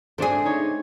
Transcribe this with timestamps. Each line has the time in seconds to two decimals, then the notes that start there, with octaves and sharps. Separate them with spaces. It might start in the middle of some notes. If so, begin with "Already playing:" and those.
0.18 A3 C4 D4 G#4 D5
0.45 D#4 C#5